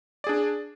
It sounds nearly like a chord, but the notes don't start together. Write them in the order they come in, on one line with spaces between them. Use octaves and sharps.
D5 G#4 D4